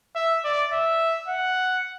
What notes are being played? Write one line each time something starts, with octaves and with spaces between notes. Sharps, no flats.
E5
D5
E5
F#5